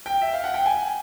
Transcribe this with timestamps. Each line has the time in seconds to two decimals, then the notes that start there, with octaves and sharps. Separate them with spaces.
0.06 G5
0.21 E5
0.33 F5
0.44 F#5
0.54 G5
0.66 G#5